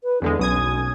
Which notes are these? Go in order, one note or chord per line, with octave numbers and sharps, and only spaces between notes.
B4
E2 D3 G#3 D4
B1 C#4 D#6 G#6